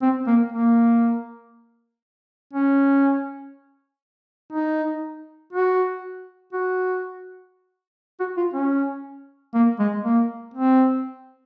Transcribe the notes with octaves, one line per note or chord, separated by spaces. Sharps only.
C4
A#3
A#3
C#4
D#4
F#4
F#4
F#4
F4
C#4
A#3
G#3
A#3
C4